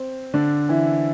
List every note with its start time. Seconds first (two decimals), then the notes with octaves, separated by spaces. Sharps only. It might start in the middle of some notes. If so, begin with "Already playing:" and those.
Already playing: C4
0.34 D3 D4
0.69 E3 E4